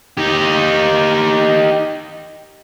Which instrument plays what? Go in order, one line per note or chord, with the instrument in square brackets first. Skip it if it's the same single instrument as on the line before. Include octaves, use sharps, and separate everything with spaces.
[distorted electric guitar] D#4 G4